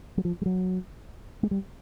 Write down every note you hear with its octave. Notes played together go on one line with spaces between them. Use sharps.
F#3
F3
G3
F#3
G#3
G3